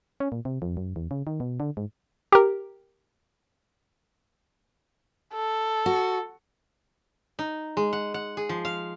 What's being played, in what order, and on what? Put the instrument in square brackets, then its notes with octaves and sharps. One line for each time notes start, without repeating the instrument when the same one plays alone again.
[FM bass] C#4
A#2
C3
F2
F#2
E2
C#3
D#3
B2
D3
G#2
[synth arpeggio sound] G4 A#4
[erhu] A4
[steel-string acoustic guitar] F#4
[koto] D#4
G#3
F#5
F#5
G#4
F3
F5